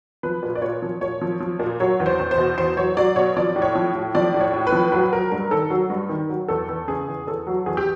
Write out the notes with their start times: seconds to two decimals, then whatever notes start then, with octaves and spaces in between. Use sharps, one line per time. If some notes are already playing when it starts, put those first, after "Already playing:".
0.23 F3 B4
0.43 A#2
0.55 D5
0.62 A#2 C#5
0.82 F3
1.01 A#2 C#5
1.21 F3
1.40 F3
1.59 A#2
1.80 F#3 C#5
2.00 E2
2.06 C5
2.19 E2
2.31 C5
2.38 B2
2.57 E2 C5
2.77 F#3 C#5
2.97 F#3 D5
3.16 B2 C#5
3.37 F3 D5
3.56 A2
3.62 C#5
3.75 F3
3.95 A2
4.15 F3 D5
4.34 A2
4.40 C#5
4.54 A2
4.67 B4
4.72 F3
4.92 F#3 B4
5.13 F#3 A#4
5.32 G2 A#4
5.51 D#3 A4
5.70 F#3
5.90 G2
6.09 D#3
6.29 F#3
6.48 E2 A4
6.69 E2
6.88 C#3 G#4
7.08 E2
7.27 E2 A4
7.47 F#3
7.66 E2 G#4
7.77 G4